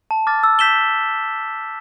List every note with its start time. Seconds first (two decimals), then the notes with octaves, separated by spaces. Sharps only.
0.11 A5
0.27 D6 F6 A6
0.43 E6
0.59 G6 B6 E7 G7
0.76 G6